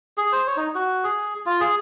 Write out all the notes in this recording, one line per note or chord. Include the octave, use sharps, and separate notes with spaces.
G#4
C5
C#5
D#4
F#4
G#4
F4
G#4